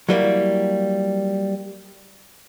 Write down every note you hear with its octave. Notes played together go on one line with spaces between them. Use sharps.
F#3 G3 A#3 E4